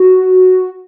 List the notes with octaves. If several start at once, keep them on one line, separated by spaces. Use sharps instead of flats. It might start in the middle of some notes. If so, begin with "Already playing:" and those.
Already playing: F#4